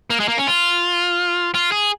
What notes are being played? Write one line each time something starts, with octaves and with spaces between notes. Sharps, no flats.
A#3
G#3
A#3
C#4
F4
F4
G#4